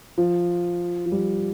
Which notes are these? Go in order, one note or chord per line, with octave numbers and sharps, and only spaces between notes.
F3
F3
G3